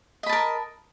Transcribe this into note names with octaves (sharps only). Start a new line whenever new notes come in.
A#4 D#5 A5 B5